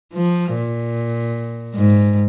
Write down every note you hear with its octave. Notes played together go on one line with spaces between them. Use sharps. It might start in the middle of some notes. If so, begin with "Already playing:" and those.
F3
A#2
G#2